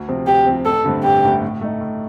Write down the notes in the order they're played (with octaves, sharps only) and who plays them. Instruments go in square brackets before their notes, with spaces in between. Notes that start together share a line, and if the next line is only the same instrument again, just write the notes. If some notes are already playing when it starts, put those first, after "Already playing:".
Already playing: [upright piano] D2
C3 F3 C4
[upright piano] D2 [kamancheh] G4
[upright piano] C3 F3 C4
[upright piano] A1 [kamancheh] A4
[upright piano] G2 D3 A3 C4
[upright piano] A1 [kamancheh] G4
[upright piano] G2 D3 A3 C4
A2
A3 D#4
A2